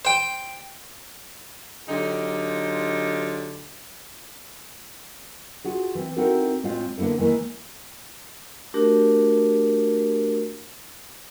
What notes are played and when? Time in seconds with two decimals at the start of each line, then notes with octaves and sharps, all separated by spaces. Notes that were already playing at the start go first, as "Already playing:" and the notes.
0.05 C5 G5
1.88 D3 F#3 D#4 F4 G4
5.64 F4 F#4 G#4
5.95 E3 C4
6.16 C4 D#4 E4 F#4 A4 A#4
6.63 A2 G#3 C4 F4 F5
6.98 D3 A#3 B3 E4 A4
7.18 D#3 E3 G#3 A#3 E4
8.74 A3 D4 F#4 G4 A#4